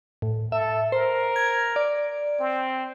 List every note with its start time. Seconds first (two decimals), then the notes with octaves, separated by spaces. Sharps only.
0.22 A2
0.52 A4 E5
0.92 A#4 C5
1.36 G#6
1.76 D5
2.40 C4